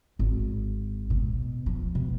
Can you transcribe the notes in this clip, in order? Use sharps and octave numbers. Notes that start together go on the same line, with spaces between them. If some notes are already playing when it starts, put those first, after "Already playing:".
G#1
B2
F3
B2